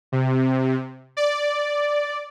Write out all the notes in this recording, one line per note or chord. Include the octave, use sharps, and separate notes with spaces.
C3
D5